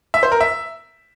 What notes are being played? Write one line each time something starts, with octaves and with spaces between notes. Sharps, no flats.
E5
C5
A#4
E5